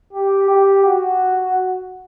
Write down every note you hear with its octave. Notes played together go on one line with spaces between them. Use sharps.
G4
G4
F#4